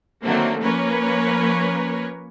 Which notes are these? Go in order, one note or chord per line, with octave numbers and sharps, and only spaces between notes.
D3 D#3 F#3 A3 A#3 C4
F3 A#3 C#4 A#4 B4 C#5